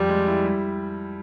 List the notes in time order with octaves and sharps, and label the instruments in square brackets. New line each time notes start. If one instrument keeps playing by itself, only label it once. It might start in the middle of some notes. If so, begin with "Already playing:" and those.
Already playing: [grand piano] F2 [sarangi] G3
[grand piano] G#3
E4
G3